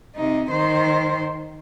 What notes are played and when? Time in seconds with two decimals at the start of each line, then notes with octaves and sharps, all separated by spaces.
0.16 C3 D#4
0.50 D#3 C5